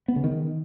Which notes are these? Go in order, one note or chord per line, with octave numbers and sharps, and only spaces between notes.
B3
C#3
D#3